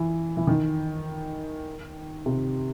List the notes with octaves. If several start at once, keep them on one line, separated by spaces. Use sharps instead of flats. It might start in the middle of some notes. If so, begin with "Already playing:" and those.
Already playing: E3
E3
D#3
C3